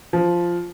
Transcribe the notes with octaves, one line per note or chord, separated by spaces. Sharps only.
F3